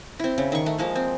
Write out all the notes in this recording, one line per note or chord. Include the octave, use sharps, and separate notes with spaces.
C4 E4
C#3
D#3 C#6
A3
F3 G#3 A#3
C4